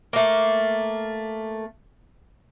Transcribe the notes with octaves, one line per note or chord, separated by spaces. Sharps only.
A3 A#3